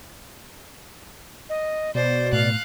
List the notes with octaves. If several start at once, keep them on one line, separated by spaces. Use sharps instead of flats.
D#5
B2 C5 D5
A2 F5 F#6